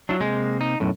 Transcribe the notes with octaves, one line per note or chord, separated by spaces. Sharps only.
F#3 D4 E4 F4
C3 G#3 A#3 C4
D#4
B1 F#2 A2